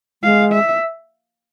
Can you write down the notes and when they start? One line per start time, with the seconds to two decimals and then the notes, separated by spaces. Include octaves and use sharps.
0.23 G#3 F5
0.53 E5